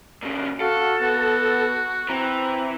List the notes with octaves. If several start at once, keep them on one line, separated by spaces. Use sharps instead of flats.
A#2 C#3
F#4 A4 F5
B3 F#4
E3 C4 A#5